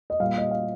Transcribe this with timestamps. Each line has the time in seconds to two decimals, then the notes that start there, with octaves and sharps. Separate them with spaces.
0.10 D#5
0.20 A#2 G3 F5
0.38 D#5
0.51 F5